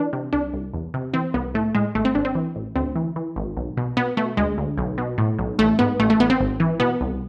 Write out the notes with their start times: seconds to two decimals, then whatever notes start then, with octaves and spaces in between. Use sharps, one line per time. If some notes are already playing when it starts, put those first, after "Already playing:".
Already playing: E3 D4
0.13 C3
0.33 C2 D4
0.53 C2
0.74 E2
0.94 C3
1.14 E3 C4
1.34 C2 B3
1.54 A2 A3
1.75 A2 G#3
1.95 G#1 A3
2.05 C4
2.15 G#1 D4
2.25 C4
2.35 E3
2.56 A1
2.76 D2 C4
2.96 E3
3.16 E3
3.36 G#1
3.57 B1
3.77 B2
3.97 B2 B3
4.17 B2 A3
4.37 D2 G#3
4.58 D2
4.78 B1
4.98 B2
5.18 A2
5.39 B1
5.59 A1 A3
5.79 G#2 B3
5.99 A1 A3
6.10 A3
6.20 A1 B3
6.30 C4
6.40 G#1
6.60 E3
6.80 B2 B3
7.01 C2